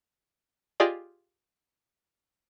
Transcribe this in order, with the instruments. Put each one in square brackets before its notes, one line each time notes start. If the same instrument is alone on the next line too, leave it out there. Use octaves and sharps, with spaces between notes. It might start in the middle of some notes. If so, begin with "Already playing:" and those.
[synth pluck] F4 G4 G#4 D5 D#5